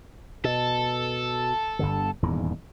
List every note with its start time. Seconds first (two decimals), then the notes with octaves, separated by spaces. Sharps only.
0.44 B2 A4
1.79 G1 G2 D3
2.23 D#1 E2 G#2